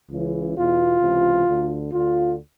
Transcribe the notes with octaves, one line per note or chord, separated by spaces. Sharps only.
C#2 C#3 E3
E2 B2 F4
C#2 C3 E3
D2 D3
D2 D3 F4